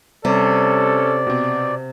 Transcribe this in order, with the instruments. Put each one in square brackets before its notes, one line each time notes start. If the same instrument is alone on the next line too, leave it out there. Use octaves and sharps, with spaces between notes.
[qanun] C3 [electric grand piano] G3 [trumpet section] C#4 A4 [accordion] D5
[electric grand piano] B2 C4